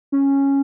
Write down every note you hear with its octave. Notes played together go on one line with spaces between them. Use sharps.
C#4